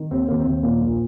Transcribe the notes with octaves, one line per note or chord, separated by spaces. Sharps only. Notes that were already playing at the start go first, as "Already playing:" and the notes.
Already playing: D#3
D#2 C4
D#2 A#3
C4
D#2
A#2 A#3
A#1